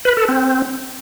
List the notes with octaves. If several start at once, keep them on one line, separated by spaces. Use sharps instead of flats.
B4
A4
C4